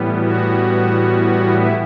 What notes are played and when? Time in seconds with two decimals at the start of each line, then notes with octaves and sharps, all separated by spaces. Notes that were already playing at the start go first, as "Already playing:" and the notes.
Already playing: A2 E3 G3 B3
0.16 F#4
1.49 E4